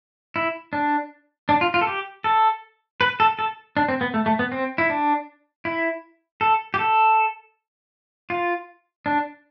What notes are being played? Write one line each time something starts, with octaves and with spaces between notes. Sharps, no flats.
E4
D4
D4
F4
F4
A4
G4
A4
B4
A4
A4
D4
C4
B3
A3
A3
B3
C4
E4
D4
E4
A4
G4
A4
F4
D4